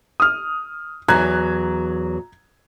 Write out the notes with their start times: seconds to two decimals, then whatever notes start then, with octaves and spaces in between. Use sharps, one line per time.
0.20 D#6 F6
1.08 E2 F#3 A#5 F#6 G#6